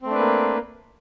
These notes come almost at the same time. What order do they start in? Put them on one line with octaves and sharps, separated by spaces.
C4 A3 D4 B4 A#3